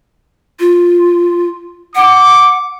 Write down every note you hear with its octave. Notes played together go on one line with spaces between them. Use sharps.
F4
F#5 D6